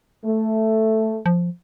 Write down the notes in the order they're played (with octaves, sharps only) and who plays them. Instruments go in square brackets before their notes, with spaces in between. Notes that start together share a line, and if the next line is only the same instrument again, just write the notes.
[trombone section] A3
[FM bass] F3